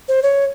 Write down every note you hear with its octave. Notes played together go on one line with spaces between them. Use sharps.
C5
C#5